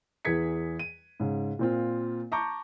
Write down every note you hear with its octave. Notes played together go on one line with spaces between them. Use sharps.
E2 E3 G#4 G#6 B6 C#7
D#7
G#2 C#3
A#2 C4 F4
A5 A#5 C#6 D6 G6